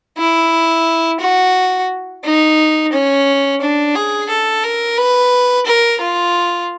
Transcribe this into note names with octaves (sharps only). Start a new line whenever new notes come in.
E4
F#4
D#4
C#4
D4
G#4
A4
A#4
B4
A#4
F4